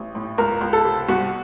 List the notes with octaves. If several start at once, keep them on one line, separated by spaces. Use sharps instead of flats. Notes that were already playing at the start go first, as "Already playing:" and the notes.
Already playing: A1
A2
C#2 A#4
C#2
A4
C3
C2 F#4